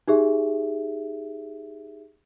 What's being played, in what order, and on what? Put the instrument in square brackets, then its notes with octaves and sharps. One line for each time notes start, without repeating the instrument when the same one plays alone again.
[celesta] D#4 G4 G#4 E5